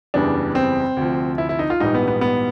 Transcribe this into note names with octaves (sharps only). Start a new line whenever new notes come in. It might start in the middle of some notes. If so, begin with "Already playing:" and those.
F#1 E2 C#3 E3 G3 D4
C4
D2 C3 F3
E4
E4
D#4
F4
A#1 G#2 E3 G3 D#4
B3
B3
B3